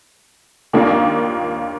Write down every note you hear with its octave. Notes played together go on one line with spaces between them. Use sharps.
D#2 D#3 A#3 D4 F4